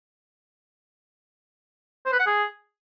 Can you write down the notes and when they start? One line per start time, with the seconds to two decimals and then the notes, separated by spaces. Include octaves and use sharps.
2.06 C5
2.12 B4
2.19 F#5
2.26 G#4